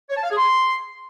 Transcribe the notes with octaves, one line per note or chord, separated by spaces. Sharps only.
C#5
A5
F5
G#4
C6